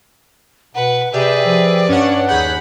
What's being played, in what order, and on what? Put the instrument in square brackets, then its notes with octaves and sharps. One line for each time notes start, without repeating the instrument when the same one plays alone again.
[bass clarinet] B2 [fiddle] B4 [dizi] F#5
[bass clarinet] C3 [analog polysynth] G4 E5 [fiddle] G#4 B4 [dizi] D5
[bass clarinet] F3
[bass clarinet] G2 [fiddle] B3 D4 [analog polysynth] C#4 C#5 F#5
[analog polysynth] D#2 G#4 F#5 [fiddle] B5 [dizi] G6